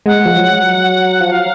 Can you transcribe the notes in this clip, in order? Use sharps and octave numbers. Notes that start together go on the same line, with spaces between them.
G#3 F#5
F3
F#3
F3
F#3 F5